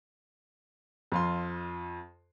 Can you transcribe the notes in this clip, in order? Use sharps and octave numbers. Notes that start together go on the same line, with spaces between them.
F2 F4 C6